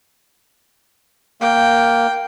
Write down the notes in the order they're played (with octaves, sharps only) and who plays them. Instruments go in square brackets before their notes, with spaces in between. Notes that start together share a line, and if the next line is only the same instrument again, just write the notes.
[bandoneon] A#3 [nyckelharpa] G5